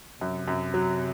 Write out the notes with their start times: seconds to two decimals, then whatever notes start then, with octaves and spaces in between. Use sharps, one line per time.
0.21 F#2 C3
0.48 F#2
0.74 F#3